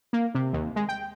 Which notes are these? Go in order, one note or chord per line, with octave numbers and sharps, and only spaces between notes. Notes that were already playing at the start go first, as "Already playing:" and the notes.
A#3
C3
D#2
G#3
G5